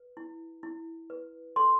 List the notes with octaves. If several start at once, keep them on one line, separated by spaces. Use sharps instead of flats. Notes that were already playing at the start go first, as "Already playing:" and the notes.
Already playing: B4
E4
E4
B4
A4 C6